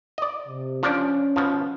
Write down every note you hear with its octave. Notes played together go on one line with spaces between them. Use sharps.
D5 D#5
C3
F3 C#4 D4 D5
B2 F3